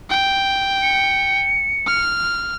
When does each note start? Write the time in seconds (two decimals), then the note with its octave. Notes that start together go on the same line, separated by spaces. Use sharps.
0.10 G5
0.82 C#7
1.87 F6